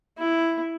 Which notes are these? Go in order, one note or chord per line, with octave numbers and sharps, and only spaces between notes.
E4